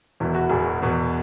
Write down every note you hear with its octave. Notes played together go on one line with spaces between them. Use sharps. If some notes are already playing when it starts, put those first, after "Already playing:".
E1 E2 B2 E4
F#4
E1 E2 B2 G#4
F#4
E1 E2 B2